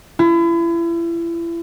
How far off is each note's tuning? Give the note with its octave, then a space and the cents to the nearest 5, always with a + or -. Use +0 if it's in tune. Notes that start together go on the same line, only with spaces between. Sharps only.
E4 +35